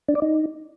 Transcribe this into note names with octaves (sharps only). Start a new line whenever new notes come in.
D4
D5
D#4